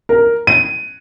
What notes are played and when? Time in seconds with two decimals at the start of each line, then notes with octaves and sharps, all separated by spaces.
0.09 A#4
0.47 D#7